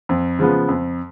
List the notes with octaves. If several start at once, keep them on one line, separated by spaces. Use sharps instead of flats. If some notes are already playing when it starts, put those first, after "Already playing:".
F2
C#3 F3 G#3 B3
F2